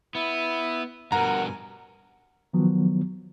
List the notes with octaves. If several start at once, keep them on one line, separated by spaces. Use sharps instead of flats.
B3 E4
G2 B2 A#4 F#5 G#5 A#5
D#3 F3 F#3 B3